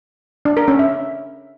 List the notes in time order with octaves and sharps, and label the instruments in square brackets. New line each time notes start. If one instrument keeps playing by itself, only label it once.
[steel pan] D4
A#4
C#4
E5